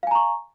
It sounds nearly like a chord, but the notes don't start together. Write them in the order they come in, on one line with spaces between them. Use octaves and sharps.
F5 G#5 A#5 C#6